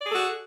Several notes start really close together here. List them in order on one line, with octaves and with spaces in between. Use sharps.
D5 G#4 A4 F#4